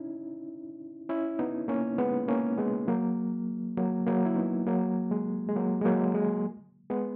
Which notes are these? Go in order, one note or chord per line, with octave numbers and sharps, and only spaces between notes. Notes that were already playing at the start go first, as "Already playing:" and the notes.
Already playing: C#4 D#4 E4
C#4 E4
B3 D#4
A#3 C#4
G#3 B3
A#3 C#4
G#3 B3
F#3 A#3
F#3 A#3
F#3 A#3
E4
B3 D#4
F#3 A#3
G#3
G#3
F#3 A#3
G#3
F#3 A#3
G#3
G#3 B3